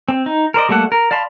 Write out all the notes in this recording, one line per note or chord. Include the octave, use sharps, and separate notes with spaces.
C4
D#4
A#4 C5 D5 D#5
G3 A3 A#3 A4 F#5
A#4
D5 F5 A5 B5 C6